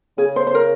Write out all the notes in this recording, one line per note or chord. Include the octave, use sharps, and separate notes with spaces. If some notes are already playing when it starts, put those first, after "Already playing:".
C#3 G#4
C5
C5
A#4